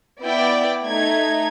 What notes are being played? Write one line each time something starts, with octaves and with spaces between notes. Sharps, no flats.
B3 E4 D5 G5
A3 D#4 G#6